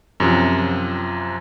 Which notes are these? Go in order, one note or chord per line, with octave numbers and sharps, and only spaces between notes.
F#2 C3 F3